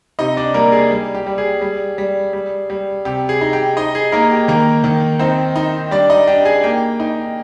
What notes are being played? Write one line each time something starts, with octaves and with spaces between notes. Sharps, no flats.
C3 D#4 D#5
D4 D5
G3 A#3 A#4
G#4
G3
G4
G3
G#4
G3
G3
G3
G3
C3 G4
G#4
D#4
G4 G5
D#4 D#5
G#4
A#3 D#4 A#4
G4
D#3 A#3 A#4
D#3
C4 D#4 C5
D#4
G3 D4 D5
D#4 D#5
D4 G4 G5
G#4 G#5
A#3 G4 G5
D#4